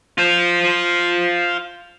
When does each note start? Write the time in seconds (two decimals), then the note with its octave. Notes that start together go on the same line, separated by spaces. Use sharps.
0.18 F4 C5